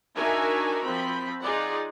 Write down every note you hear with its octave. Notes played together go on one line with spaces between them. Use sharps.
D4 D#4 F#4 A#4 E5 G#5
F3 C4 B5
D#4 F4 G#4 D5 F#5